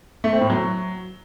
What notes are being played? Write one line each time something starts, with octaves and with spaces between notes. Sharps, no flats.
A3
C4
A2
F#3